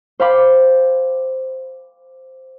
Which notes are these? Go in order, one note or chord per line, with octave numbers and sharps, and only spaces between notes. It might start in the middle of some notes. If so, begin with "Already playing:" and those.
C5 F5 G5 B5 D6